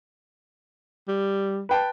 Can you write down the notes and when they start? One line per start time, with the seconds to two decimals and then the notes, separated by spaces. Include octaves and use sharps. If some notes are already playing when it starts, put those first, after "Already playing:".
1.08 G3
1.69 B4 G5 A5